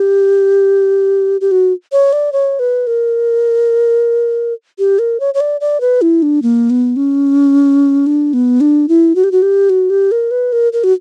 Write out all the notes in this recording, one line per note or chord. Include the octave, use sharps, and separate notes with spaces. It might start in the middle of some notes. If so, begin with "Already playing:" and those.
Already playing: G4
G4
F#4
C#5
D5
C#5
B4
A#4
G4
A#4
C#5
C#5
D5
D5
B4
E4
D4
A#3
B3
C#4
D4
B3
D4
E4
F#4
G4
F#4
G4
F#4
G4
A#4
B4
A#4
A#4
F#4